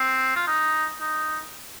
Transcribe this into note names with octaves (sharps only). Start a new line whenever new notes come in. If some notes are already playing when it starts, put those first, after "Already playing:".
Already playing: C4
F4
D#4
D#4